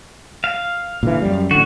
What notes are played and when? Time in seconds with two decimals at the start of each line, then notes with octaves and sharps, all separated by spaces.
0.44 F5
1.03 A#2 D3 E3
1.22 F#2 G3
1.51 A1 D3 F#4